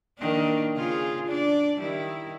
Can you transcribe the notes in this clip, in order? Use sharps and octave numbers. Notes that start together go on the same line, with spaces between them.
D#3 A#3 D4
C#3 F4 G#4
D4 D5
D#3 G3 E4